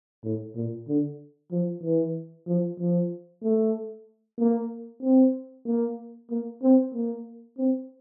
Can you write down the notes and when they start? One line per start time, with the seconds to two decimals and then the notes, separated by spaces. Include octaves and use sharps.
0.24 A2
0.56 A#2
0.88 D3
1.52 F3
1.83 E3
2.47 F3
2.80 F3
3.43 A3
4.39 A#3
5.02 C4
5.66 A#3
6.31 A#3
6.62 C4
6.94 A#3
7.58 C4